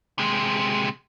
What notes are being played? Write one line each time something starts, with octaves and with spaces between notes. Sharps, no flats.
C3 G#3